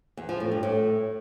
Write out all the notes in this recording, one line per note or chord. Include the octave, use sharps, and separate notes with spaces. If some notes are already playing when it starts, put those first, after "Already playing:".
E2
F3
A2
G2
A2